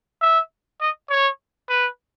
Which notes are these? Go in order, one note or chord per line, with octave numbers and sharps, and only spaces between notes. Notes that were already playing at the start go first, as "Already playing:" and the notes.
E5
D#5
C#5
B4